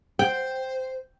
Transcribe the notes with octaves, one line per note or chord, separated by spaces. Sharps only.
C5 G5